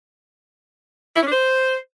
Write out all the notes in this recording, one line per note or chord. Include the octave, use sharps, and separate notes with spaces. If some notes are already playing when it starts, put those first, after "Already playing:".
E4
C#4
D4
C5